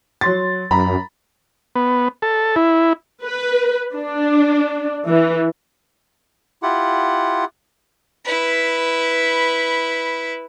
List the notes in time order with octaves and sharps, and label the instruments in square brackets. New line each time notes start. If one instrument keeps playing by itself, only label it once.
[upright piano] F#3 C6 A6
[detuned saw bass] F#2 [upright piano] A#5 B5
[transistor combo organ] B3
A4
E4
[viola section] B4
D4
E3
[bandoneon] E4 F4 G4 F#5
[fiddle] E4 B4